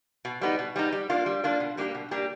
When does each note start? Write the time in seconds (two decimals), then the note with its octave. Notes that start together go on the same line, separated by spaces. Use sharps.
0.25 B2
0.41 G3 B3 D#4
0.59 B2
0.76 G3 B3 D#4
0.92 G3
1.10 A#3 D4 F4
1.26 G3
1.44 A#3 D4 F4
1.60 B2
1.77 G3 A#3 D4 G4
1.95 B2
2.11 G3 A#3 D4 G4